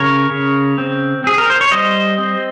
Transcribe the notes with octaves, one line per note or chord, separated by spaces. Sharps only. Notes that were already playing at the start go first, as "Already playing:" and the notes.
Already playing: C#3 A#4 C#5
C#3
C4
C4 G#4
A#4
C5
C#5
G3 C5 D#5
C4